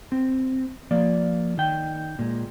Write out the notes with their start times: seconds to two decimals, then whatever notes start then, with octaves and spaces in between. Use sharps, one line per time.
0.12 C4
0.91 F3 A#3 D5
1.58 D#3 G5
2.19 A#2 G#3